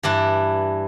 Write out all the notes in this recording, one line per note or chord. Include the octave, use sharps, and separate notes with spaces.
G2 E3 D4 E4